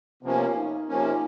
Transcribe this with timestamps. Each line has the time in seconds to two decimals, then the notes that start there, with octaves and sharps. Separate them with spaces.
0.23 C3 F3 A#3 B3 C#4
0.56 D#4
0.89 C3 F3 A#3 C#4